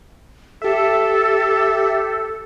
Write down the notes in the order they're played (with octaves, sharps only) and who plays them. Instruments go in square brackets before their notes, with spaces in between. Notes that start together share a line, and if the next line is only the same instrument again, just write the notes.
[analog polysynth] G4 E5 [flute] A4